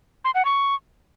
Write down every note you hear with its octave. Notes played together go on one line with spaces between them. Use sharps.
C6
F#5
C#6